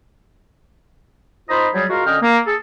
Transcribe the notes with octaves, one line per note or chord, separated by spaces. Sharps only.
D#4 F4 C5 D#5 A#5 B5
F#3 G3 G#4
G#3 F4 F#4 A#4 F5
D3 C#4 D#5 G5 F6
A#3
G#4 A4